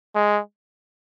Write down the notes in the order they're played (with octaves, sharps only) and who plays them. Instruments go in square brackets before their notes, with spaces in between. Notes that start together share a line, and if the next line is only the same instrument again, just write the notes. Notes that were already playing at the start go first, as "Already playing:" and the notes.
[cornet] G#3